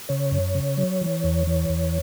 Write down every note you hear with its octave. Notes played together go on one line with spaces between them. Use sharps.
C#3 C#5
F#2
C#3
F#3
E3
E2
E3
E2